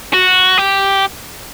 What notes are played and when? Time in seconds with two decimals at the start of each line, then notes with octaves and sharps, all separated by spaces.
0.14 F#4
0.58 G4